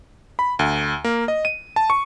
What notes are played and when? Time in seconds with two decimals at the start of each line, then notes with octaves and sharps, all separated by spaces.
0.39 B5
0.59 D2
1.04 A#3
1.28 D#5
1.45 D#7
1.76 A5
1.90 C#6